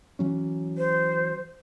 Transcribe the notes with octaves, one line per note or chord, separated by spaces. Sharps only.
E3 F#3 C#4
C5